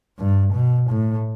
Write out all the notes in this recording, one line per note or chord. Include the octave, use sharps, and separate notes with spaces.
G2
B2
A2